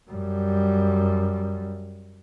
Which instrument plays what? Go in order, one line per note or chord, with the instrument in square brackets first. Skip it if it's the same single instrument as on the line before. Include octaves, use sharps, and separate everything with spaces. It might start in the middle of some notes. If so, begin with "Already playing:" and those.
[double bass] F#2 G3